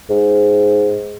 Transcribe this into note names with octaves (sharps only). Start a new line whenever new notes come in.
G#2